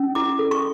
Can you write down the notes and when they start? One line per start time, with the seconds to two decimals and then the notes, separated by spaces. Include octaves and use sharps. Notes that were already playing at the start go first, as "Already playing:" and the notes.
Already playing: C#4
0.15 E4 D6
0.39 A4
0.51 C#6